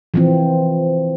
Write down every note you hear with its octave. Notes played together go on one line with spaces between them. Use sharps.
E3 F3 C4